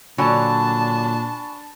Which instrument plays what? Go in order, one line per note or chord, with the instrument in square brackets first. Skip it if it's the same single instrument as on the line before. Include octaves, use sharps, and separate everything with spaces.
[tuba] A#2 [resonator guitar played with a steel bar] D3 F#3 [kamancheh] D4 A5 [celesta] G#5 B5 C#6